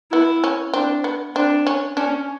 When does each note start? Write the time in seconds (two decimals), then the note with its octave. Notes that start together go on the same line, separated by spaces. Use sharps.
0.12 B3 E4
0.44 C#4
0.74 C4 D4
1.04 B3
1.35 C4 D4
1.67 C#4
1.97 C#4 D4